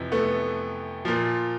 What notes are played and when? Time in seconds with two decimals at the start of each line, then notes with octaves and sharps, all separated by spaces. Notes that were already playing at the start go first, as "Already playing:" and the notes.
Already playing: F2 C3 E3
0.12 A3 B3
1.05 A#2 F3